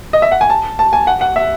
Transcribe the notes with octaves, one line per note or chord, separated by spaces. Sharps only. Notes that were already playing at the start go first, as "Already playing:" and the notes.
D#5
E5
F#5
G#5
A5
A5
G#5
F#5
F#5
E5